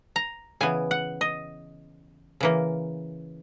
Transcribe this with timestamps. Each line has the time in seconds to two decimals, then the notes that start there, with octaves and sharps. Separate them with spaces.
0.16 A#5
0.61 C#3 E3 B3 G#5
0.91 F#5
1.21 D#5
2.40 C#3 E3 A#3